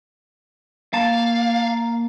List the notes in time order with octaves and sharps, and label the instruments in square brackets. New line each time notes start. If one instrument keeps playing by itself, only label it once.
[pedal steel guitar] A#3 A5 [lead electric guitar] F5